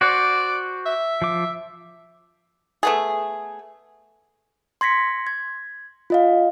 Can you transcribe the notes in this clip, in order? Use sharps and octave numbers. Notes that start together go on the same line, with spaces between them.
F#4 C5 D5 F#5
E5
F3 D6
A3 B3 G#4
C6 G#6 A#6 B6 C#7
G#6
F4 D#5 F5